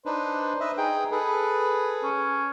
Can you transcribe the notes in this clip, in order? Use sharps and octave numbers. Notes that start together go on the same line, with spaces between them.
D4 D#4 B4 C5
B4 D#5 E5
D#4 G#4 G5
G#4 A4 B4
C#4